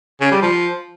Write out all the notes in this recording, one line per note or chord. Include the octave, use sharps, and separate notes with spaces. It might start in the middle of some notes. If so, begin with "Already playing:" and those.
C#3
G3
F3